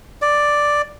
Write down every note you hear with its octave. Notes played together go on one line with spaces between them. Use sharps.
D5